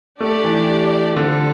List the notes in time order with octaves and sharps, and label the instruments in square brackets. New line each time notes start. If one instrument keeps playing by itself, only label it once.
[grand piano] A3 [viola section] D4 G4 D5
[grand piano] E3
[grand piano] D3 [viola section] G3 C4 F4 A4